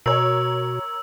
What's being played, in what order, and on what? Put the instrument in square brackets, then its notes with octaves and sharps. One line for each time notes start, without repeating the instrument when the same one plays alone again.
[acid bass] B2 [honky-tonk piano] A#4 C#5 [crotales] E6